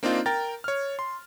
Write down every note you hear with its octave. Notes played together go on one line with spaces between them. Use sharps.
A#3 C4 D4 D#4 F4
A#4 G5 A#5 A6
C#5 F6
C6